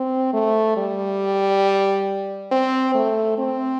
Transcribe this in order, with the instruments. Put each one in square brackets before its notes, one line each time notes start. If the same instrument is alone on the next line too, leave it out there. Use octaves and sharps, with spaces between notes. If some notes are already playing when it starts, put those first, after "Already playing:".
Already playing: [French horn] C4
A3
G3
C4
A3
C4